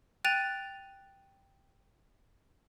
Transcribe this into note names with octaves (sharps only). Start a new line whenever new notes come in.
G5 F#6 A6 D#7 F7